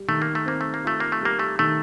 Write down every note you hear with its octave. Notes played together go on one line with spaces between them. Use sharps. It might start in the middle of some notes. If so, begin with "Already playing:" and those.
Already playing: G3
D#3 A3
A#3
A3
A#3 C4
A3
A#3
A3 F4
A#3
A3
G3 A#3
A3
D#3 A3